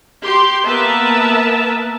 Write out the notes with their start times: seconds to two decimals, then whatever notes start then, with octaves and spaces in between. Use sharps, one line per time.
0.23 G4 C6
0.67 A#3 B3 A#4 B4 E5 A5